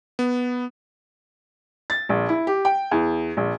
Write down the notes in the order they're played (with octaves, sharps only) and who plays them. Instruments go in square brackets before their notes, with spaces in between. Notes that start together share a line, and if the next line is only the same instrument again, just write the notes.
[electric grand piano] B3
[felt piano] A6
A#1
E4
G4
G5
E2
A#1